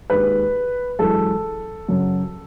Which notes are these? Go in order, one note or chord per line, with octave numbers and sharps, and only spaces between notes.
D#2 D#3 G#3 B4
F#2 E3 G#3 A4
F#2 C#3 F#3